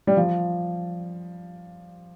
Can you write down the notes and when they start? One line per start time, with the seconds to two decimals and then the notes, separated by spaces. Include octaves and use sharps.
0.07 G3
0.17 F3